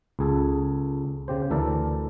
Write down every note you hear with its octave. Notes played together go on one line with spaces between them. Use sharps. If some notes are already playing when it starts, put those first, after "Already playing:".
C#2 G#4 A4
C#3 G4 C5
D2 E3 A4 A#4 D5 A5